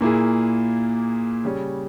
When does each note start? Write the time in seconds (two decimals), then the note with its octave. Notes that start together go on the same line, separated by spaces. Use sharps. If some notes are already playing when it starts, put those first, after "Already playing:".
0.01 A#2 A#3 E4 G#4
1.44 C#3 G3 C#4